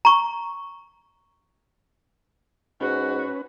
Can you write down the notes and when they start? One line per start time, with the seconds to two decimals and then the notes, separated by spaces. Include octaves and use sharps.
0.05 A#5 C#6
2.81 G#2 C#4 F#4 B4